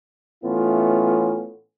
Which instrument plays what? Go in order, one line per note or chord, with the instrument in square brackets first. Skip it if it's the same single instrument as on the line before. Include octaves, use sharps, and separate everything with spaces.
[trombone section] A2 E3 A3 B3 C#4 F4